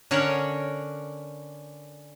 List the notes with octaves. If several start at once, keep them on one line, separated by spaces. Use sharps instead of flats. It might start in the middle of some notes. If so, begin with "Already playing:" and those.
D3 C#4 A#4 C#5 F#5